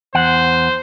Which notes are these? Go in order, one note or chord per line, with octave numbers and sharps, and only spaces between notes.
E2 C5 F#5